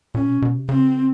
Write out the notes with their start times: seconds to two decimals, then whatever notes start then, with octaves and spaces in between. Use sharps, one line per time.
0.14 A#2 C#4
0.29 B2
0.42 B2
0.55 C3
0.69 C#3 C4